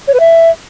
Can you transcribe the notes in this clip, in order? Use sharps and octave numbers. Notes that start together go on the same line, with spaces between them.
C#5
B4
E5